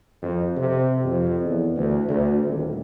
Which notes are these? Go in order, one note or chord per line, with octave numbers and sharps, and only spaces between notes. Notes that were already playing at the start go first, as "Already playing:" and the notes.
F2
C3
F2
E2
D2
D2
D#1